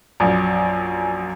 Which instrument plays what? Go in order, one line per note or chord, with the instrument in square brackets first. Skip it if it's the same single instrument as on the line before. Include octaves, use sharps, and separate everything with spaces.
[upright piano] A#1 F#2